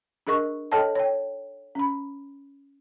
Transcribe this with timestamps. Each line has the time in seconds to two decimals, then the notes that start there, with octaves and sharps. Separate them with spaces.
0.27 D4 G#4 A#4 D#5 C#6
0.72 A4 C#5 D#5 G5 A5
0.95 C#5 G5
1.75 C#4 B5